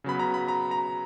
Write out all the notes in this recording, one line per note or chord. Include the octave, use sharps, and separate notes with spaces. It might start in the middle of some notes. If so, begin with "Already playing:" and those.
C#3 F#3 B3 B5
A#5
B5
A#5
A#5